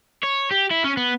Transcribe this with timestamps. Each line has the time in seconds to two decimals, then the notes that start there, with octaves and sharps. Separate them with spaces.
0.23 C#5
0.51 G4
0.71 E4
0.84 C#4
0.97 B3